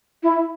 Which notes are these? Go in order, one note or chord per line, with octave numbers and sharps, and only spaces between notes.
E4